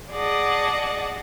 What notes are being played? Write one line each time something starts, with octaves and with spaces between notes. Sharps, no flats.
G#4 D5 D#5 F#5 A5